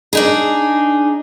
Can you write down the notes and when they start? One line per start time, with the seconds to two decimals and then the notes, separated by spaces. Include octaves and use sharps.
0.13 D4 D#4 G#4